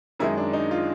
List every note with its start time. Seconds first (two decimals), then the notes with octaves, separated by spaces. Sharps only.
0.19 F#2 D#3 G#3 E4
0.37 D4
0.53 D#4
0.71 F4